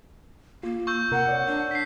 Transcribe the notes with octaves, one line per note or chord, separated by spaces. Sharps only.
A#3 F4
C#6 E6 G6
C3 A#4 F#5 F#6
C#5 D5
D4
D4 B6 C7